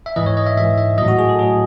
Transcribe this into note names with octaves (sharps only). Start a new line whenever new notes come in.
E5
G#2 E3 D#5
C#5
D#5
E5
G#2 E3 E5
E5
A2 F#3 D#5
F#4
G#4
A4
A2 F#3 G#4